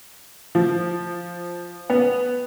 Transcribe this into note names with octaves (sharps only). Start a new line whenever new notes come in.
F3
B3